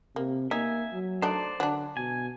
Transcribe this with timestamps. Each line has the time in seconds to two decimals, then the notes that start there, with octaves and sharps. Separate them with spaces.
0.16 C3 A#3
0.51 A#3 D#4 E5 G#5
0.92 F#3
1.22 A3 D4 D#4 C5 D5
1.60 D3 F#3 D4
1.97 B2 G#5